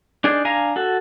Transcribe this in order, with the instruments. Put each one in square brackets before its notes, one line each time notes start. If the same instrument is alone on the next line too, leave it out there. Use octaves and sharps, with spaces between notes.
[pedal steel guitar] D4 D#4 G#4 D5
D4 F5 G#5 A#5
F#4 A4